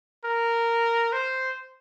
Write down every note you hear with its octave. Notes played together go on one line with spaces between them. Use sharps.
A#4
C5